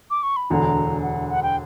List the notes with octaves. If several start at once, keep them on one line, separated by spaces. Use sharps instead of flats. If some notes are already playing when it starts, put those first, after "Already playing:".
D6
C#6
B5
E1 D2 D3 A#5
F#5
F#5
G5